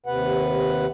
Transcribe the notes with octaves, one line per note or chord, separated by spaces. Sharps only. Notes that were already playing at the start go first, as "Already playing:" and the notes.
D#2 C3 B4 F#5